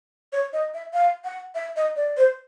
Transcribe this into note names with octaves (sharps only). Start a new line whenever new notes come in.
C#5
D#5
E5
F5
F#5
E5
D#5
D5
C5